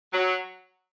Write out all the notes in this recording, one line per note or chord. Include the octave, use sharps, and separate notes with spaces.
F#3